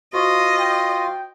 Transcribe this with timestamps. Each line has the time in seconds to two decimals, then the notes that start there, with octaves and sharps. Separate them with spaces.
0.13 F4 F#4 C5 D#5 C#6
0.60 G5